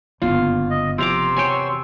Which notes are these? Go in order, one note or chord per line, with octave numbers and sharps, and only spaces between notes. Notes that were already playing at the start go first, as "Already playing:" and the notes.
F#1 G2 D3 B3 F4
D#5
C3 F3 A#5 C6 D6 E6
E2 F#4 C#5 G5 G#5